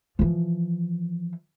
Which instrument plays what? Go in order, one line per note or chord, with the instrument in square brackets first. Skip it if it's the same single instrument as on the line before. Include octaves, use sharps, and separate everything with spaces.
[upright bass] E3 F3